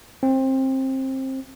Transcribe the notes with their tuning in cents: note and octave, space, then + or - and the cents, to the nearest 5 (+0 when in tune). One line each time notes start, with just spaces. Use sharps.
C4 +20